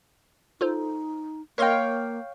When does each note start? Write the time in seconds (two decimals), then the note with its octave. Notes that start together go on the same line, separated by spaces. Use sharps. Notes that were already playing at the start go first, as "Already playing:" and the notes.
0.61 D#4 F4 A4 C5
1.58 A#3 A#4 C#5 D#5 F5 G5 C6